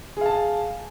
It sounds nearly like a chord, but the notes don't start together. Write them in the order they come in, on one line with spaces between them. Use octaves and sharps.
G#4 F5 A5